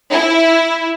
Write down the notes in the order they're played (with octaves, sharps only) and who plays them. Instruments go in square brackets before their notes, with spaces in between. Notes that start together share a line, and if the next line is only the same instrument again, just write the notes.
[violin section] E4